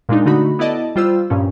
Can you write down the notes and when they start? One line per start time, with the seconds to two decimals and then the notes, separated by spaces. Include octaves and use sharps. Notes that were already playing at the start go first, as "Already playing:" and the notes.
0.09 A#2 G#3 D4 D#4
0.26 D3 A3 D#4 F#4 B5
0.59 B3 E4 A4 D5 D#5 A5
0.96 G3 F4 C5 E6
1.30 G2 A#2 F3 C#4